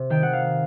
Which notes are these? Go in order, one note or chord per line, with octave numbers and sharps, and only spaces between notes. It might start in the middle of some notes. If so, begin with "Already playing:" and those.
Already playing: C3
D#3 G5
F#5
F5